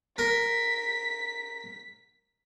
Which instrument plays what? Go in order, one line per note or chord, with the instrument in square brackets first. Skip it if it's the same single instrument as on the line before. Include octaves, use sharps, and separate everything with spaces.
[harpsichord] A#4 [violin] B6